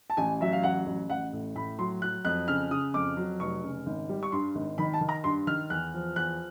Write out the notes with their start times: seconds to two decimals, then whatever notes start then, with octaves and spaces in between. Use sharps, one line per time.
0.10 A5
0.17 A1 G#5
0.41 F#3 E5
0.52 F5
0.63 A1 F#5
0.86 A1
1.10 A1 F#5
1.33 A2
1.55 A2 B5
1.79 F#3 C6
2.02 F#3 F#6
2.25 F2 F#6
2.48 C#3 F6
2.71 C#3 D#6
2.94 F2 D6
3.17 F#3
3.40 F1 C#6
3.63 C#3
3.86 G#1
4.09 G3
4.23 C#6
4.32 G2 C6
4.55 G#1
4.78 D#3 B5
4.94 A5
5.01 D#3
5.09 A#5
5.24 G2 C6
5.47 D#3 F6
5.70 E2 F#6
5.94 F3
6.16 E2 F#6